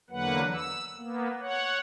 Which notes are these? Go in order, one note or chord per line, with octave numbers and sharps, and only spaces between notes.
E2 D3 F#3 A#3 B4 F#5
E6
A#3 B3
C#5 F#5